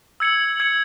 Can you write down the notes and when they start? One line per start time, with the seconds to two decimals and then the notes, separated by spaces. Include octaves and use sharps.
0.20 E6 G#6 C#7 F#7
0.60 E6 G#6 C#7 F#7